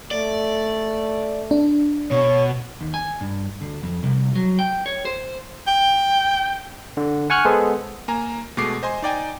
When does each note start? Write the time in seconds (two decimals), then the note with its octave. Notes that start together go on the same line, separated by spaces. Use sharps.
0.11 A3 D5
1.51 D4
2.11 B2 C#5
2.81 D#2
2.94 G#5
3.21 G2
3.61 D2
3.83 F2
4.03 C2
4.35 F#3
4.59 G5
4.86 C#5
5.05 C5
5.67 G5
6.97 D3
7.30 F#5 G#5 C#6 F6 F#6
7.45 G#3 B3 G#4 A4 C5
8.08 A#3 G#5 A#5
8.57 B2 G#3 A3 D6 C7
8.83 C5 D#5 G#5 C6
9.02 D#4 D5 G5 G#5